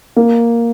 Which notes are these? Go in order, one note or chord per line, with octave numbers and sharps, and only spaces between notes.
A#3